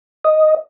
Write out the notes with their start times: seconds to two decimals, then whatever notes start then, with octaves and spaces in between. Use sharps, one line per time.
0.25 D#5